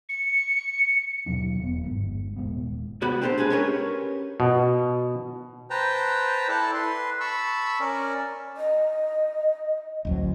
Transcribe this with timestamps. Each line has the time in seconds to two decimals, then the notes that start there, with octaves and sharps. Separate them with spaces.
0.09 C#7
1.26 D#2 B2 F#3 D4
1.59 E1 B3
1.84 G1 G#2
2.36 D#1 D#2 G#3 B3
3.02 C2 B3 F#4 D5 B5
3.22 C4 D4 G4 A4 C5
3.38 G#3 D4 G#4 B4
3.50 C#4 G4 A#4 B4 C#5
4.40 B2
5.70 B4 C5 G5 A5 A#5
6.48 E4 A4 D5 A5
6.74 B4 C6
7.20 A5 B5 C#6 E6
7.80 C#4 A#4 D5
8.57 D#5
10.05 A1 D2 F#3